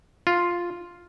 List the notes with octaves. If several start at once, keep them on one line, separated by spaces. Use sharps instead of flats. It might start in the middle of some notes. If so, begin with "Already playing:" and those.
F4